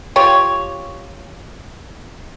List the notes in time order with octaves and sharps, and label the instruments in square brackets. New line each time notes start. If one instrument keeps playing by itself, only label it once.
[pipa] F4 G4 C#5